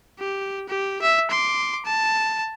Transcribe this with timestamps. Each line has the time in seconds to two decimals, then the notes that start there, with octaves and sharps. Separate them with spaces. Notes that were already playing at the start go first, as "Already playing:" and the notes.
0.19 G4
0.69 G4
1.02 E5
1.31 C6 D6
1.85 A5